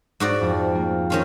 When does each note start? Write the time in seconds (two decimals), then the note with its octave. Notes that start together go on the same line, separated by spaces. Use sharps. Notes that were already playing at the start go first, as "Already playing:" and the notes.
0.20 G#2 F#4 D5
0.41 F2
0.75 A#3
1.10 D#3 C#4 F4